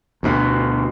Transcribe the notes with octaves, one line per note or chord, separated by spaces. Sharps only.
D2 B2